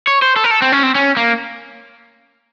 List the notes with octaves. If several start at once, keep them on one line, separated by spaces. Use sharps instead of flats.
C#5
C5
A4
A#4
A4
C4
C#4
C4
C#4
A#3